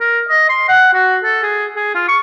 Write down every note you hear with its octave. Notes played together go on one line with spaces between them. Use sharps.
A#4
D#5
C6
F#5
F#4
A4
G#4
G#4
F4
C#6